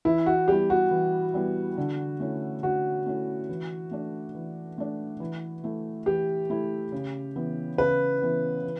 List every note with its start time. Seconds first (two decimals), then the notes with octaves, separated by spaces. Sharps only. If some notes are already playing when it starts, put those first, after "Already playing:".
0.05 E3 E4
0.26 F#4
0.48 G3 B3 E4 G4
0.70 F#4
0.91 E3
1.34 G3 B3 E4
1.78 D3
2.20 A3 C#4 E4
2.63 D3 F#4
3.06 A3 C#4 E4
3.49 E3
3.91 A3 D4
4.35 E3
4.78 A3 D4
5.20 E3
5.64 A3 E4
6.06 E3 G4
6.50 A3 E4
6.92 C#3
7.36 E3 B3
7.78 C#3 B4
8.22 E3 B3
8.64 E3